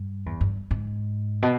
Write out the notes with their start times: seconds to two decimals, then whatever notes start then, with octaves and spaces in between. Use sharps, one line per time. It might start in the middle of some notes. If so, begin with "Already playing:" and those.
Already playing: G2
0.26 E2
0.41 G2
0.71 G#2
1.42 B2